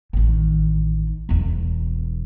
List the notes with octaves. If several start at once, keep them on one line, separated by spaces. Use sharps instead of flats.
A1 D#3
E1 E2